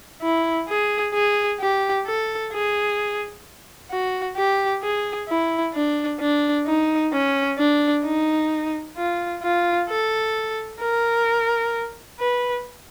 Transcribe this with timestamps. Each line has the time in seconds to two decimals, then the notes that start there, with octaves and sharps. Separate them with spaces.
0.22 E4
0.69 G#4
1.14 G#4
1.60 G4
2.07 A4
2.53 G#4
3.91 F#4
4.37 G4
4.83 G#4
5.28 E4
5.74 D4
6.20 D4
6.66 D#4
7.13 C#4
7.58 D4
8.05 D#4
8.97 F4
9.43 F4
9.89 A4
10.80 A#4
12.19 B4